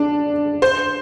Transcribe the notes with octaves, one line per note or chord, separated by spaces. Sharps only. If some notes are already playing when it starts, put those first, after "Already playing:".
Already playing: D4
C5